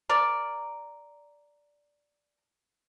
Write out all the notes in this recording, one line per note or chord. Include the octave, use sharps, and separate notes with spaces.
A#4 D5